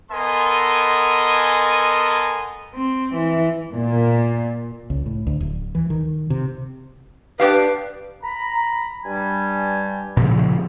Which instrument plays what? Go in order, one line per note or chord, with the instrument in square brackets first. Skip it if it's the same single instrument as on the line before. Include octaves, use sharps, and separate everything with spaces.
[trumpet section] B3 A4 A#4 D#5 G#5 C6
[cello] C4
E3
[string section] A#2
[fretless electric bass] C#2
A2
D2
D1
E3
D#3
C3
[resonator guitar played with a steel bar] D4 G4 F5 [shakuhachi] B4
[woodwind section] A#5 B5
G2 G3 G#5
[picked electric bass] A#2 C#3 F3